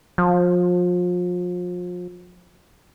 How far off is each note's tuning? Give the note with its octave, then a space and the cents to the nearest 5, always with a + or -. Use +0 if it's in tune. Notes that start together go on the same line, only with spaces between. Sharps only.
F3 +35